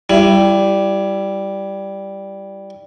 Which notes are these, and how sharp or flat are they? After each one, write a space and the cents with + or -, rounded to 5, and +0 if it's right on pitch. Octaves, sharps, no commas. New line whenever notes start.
G3 +0 E4 +30